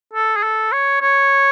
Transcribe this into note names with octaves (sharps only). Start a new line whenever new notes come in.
A4
G#4
A4
C#5
C#5